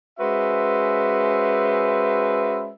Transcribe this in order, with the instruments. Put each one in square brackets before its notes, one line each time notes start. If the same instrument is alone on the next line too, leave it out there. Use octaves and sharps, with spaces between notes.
[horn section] G#3 C#4 F#4 B4 C5 E5